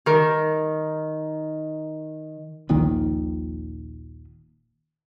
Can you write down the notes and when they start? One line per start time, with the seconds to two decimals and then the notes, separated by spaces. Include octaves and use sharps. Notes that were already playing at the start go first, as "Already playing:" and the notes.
0.06 D#3 A#4
2.69 D#1 A#1 A#2 D#3